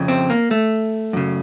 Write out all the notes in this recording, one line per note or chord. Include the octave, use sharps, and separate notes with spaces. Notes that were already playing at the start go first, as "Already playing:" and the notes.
Already playing: F2 C#3
C4
A#3
A3
F#2 C#3